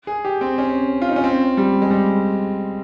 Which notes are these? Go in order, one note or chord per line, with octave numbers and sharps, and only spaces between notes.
G#4
G4
C4
C#4
F4
D#4
C#4
C4
G3
G#3
G3